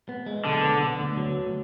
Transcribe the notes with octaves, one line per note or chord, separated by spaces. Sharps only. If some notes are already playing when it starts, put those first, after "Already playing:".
B3
G#3
B1 D3
B3
B3
D2
F#3
D2